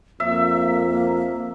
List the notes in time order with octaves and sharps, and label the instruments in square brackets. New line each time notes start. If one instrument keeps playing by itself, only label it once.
[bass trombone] F2 [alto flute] A#3 [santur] E5